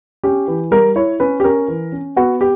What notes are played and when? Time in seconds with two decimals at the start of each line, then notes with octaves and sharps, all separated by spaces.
0.23 C#4 G4
0.48 E3
0.71 G3 A#4
0.96 E4 C#5
1.20 C#4 B4
1.40 G4
1.44 C#4 A#4
1.68 E3
1.92 C#4
2.16 B3 F#4
2.41 G4